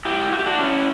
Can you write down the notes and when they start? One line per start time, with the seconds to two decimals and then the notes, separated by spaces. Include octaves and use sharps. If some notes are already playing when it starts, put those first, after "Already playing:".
0.05 E4 G4
0.32 F#4
0.39 G4
0.46 D4 F#4
0.59 C#4 E4